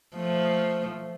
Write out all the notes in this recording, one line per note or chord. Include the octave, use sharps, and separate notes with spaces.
F3 A3